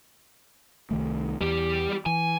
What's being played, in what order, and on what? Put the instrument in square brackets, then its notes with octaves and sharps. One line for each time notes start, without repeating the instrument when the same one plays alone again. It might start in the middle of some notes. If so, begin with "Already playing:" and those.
[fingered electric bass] C2 D#3 A3
[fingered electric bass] E2 [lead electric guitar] G3 G4
[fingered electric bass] E3 [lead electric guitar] G#5